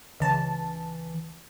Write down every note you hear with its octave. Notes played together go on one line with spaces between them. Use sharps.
C#2 E3 A5